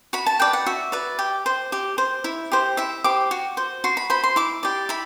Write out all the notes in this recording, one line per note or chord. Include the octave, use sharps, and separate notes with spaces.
F#4 B5
A5
B4 D5 G5
F#5
F#4 E5
B4 D5
G4
C5
G4
C5
E4
G4 C5
E4 E5
G4 C5 D6
F#4
C5
F#4 C6
B5
C5 B5
C6
E4 D6
G4 D5
E4 B5